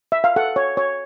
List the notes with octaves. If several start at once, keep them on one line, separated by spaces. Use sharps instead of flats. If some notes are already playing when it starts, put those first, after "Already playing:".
E5
F5
A4 F#5
C#5
C#5